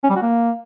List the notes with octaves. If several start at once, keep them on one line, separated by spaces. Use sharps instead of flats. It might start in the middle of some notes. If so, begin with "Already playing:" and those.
C#4
G3
F#4
A#3